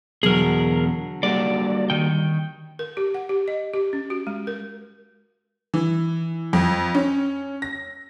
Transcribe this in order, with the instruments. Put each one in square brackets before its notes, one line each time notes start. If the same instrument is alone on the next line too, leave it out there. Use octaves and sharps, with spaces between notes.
[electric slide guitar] E2 B2 [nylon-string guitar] D3 F#3 [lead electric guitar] G#4 A#4
[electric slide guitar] G3 A#3 F#4 [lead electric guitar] D5
[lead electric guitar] D#3 G5
[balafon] A#4
G4
F#5
G4
D#5
G4
C#4
F#4
G#3
A#4
[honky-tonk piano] E3
F2
C#4
A#6